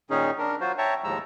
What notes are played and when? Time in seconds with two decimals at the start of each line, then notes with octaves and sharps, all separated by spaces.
0.10 A#2 D#3 C#4 D#4 G#4
0.38 D4 A#4
0.61 F#3 F4 F#4 C5
0.78 C#5 E5 G5 A5 A#5 C#6
1.04 D#2 A2 F3 G#3 A#5 E6